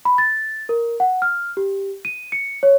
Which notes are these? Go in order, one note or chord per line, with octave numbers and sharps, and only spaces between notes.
B5
A6
A#4
F#5
F6
G4
D#7
C#7
C#5